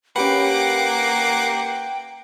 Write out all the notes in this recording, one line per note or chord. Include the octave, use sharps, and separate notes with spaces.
A#3 C#4 G4 B4 F#5 G5 D6